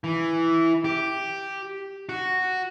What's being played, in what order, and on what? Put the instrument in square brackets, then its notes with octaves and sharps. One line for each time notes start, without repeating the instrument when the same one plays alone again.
[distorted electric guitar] E3
G4
F#4